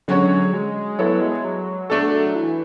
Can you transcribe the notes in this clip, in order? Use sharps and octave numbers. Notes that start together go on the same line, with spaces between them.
D3 F#3 G#3 C#4 F#4 C#5
G#3
F#3 B3 E4 A4 C#5
G#3
F#3
A3 D4 A4
E3